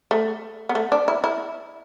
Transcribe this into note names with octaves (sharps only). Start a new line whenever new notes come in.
A3
B3
A3
D4
E4
E4